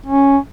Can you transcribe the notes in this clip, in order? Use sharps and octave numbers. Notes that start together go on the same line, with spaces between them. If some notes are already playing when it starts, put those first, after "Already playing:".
C#4